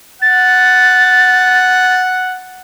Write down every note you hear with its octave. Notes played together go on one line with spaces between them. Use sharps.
F#5 A6